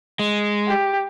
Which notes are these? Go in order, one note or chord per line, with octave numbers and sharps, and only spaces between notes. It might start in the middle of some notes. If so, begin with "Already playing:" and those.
G#3
G4